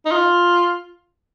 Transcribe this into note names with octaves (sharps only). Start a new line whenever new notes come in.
D#4
F4